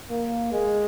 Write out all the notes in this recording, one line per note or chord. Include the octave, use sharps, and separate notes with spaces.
A#3
G#3